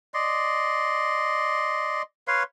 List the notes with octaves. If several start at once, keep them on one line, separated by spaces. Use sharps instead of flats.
D5 D#5 C6
B4 C#5 F5 C6